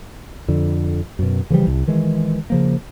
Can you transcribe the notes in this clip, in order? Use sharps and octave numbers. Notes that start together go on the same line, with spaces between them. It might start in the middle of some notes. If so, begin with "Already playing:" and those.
F2 D3
F#2 B2
C#3 E3 F3 G3
C2
D#3 E3 G#3
C#3 F3 A#3